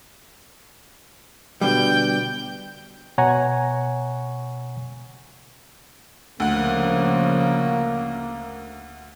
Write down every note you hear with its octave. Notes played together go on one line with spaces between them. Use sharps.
B2 D3 G3 G5 G6
B2 C#5 F#5 G#5 A#5 C#6
D2 C#3 F3 A#3 F#5